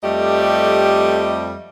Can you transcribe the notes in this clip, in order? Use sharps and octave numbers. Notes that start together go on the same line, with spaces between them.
F2 G3 A3 G4 D#5